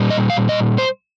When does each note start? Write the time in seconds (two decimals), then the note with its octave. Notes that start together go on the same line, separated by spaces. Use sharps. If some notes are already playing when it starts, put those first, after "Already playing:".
Already playing: A#2 G3
0.10 D#5
0.30 F5
0.49 D#5
0.78 C5